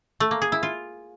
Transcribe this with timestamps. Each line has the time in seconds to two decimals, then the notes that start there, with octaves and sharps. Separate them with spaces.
0.20 A3
0.31 A#3
0.42 G#4
0.52 E4
0.63 F4